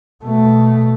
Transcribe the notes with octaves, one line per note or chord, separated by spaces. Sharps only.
B2 A3